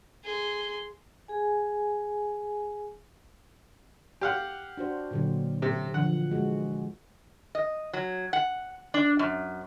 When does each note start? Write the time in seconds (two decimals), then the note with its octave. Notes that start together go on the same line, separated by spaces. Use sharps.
0.24 G#4 C6
1.28 G#4 G#5
4.21 G4 F5 F#5
4.77 D4 F#4 C5
5.11 A#2 D3 F#3
5.62 C3
5.94 D3 E3 F3 F#5
6.31 G#3 F#4
7.55 D#5
7.93 F#3
8.33 F#5
8.94 D4
9.19 F#2